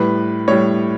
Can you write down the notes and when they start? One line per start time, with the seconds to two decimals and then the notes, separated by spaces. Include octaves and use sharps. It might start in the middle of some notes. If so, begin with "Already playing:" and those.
Already playing: A2 G3 B4
0.48 A2 G3 C#5